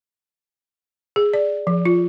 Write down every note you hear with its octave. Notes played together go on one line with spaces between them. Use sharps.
G#4
D5
F3
F4